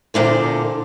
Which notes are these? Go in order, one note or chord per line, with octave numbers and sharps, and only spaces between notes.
E2 A#2 D3 C5